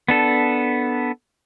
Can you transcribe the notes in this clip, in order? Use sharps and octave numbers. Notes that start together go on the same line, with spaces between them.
B3 D4 A4